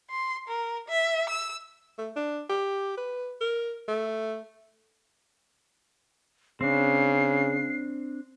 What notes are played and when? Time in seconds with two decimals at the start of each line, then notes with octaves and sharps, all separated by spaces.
0.10 C6
0.48 A#4
0.88 E5
1.29 E6
1.98 A3
2.16 D4
2.49 G4
2.97 B4
3.41 A#4
3.88 A3
6.61 C#3 C4 D4 C7